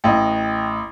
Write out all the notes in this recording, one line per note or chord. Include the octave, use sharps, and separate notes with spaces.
A1 D#5 G5